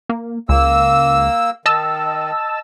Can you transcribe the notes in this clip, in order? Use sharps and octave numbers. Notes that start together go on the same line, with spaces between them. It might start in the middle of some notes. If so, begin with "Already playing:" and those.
A#3
C#2 A#3 E6
D#3 D#5 A5 E6